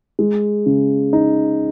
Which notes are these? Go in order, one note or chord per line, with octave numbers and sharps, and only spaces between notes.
G#3
C#3
D#4